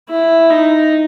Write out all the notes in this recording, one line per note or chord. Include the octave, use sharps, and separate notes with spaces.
E4
D#4